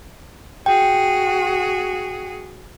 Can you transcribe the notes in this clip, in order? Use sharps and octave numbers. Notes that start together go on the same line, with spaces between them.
F#4 G#4 G5